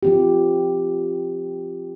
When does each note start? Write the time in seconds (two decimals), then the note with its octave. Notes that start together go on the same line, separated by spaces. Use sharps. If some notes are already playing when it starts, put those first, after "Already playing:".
0.03 F3 C4 G4